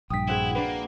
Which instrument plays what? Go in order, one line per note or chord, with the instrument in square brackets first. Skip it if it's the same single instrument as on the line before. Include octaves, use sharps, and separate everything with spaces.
[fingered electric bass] A#1 G2 [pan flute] G5 [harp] D#6 B6
[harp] C4 F#4 G#4 [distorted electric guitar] E4
[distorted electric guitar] A#3 [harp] D4 B4